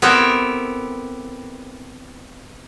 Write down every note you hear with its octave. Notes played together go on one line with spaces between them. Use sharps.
B3 C4 E4 G4 A4 A#4